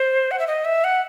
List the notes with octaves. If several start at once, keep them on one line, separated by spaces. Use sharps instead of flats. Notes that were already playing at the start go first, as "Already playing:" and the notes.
Already playing: C5
F#5
E5
D#5
E5
F#5